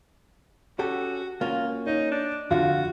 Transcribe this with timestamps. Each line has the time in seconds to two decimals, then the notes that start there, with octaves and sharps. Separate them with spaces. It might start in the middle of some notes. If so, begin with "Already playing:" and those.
0.79 C#4 F#4 G4 A4
1.41 A#3 C#4 F4 F#4
1.87 D#4 C#5
2.11 D4
2.51 F2 D3 F4 F#4